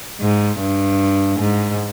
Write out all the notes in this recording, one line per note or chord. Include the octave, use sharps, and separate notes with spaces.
G#2
G2
G#2